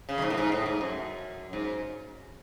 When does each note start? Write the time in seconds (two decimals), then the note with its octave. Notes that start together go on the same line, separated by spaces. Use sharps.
0.09 C#3
0.18 F#2
0.22 G#2
0.30 A2
0.37 G#2
0.52 A2
0.66 G#2
0.81 F#2
1.53 G#2